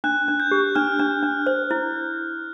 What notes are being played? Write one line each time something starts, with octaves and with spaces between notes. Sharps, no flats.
D4 F#6
D4
G6
G4
D4 F6
D4
D4
C5
E4